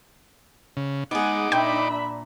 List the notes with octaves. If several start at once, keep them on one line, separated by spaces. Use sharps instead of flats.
C#3
G#3 B3 D#4 G#4 F#5 D6
A#2 D4 E5 G5 B5